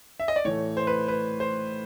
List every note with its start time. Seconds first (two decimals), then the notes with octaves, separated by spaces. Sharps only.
0.20 E5
0.28 D#5
0.36 D5
0.45 A2 E3 A3 C#5
0.77 C5
0.87 B4
1.08 B4
1.40 C5